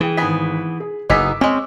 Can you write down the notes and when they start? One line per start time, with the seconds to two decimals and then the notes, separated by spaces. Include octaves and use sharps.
0.01 E3 G#4 G5
0.17 G#1 B3 G#4 B6
0.80 G#4
1.10 F#1 B3 D#4 G#4 D6 E6 B6
1.41 G#3 C4 C#4